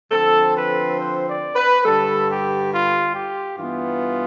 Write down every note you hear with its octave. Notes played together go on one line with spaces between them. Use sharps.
D3 F3 C4 A4
B4
C5
D5
B4
G2 D3 G3 A4
G4
F4
G4
G2 E3 B3 F4